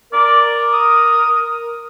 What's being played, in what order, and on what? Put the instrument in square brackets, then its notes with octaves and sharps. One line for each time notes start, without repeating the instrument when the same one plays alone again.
[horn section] A#4 [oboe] D5
[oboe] D#6